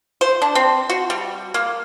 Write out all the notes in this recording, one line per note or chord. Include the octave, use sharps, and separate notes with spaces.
C5
D4
C4
F#4
G3
A#3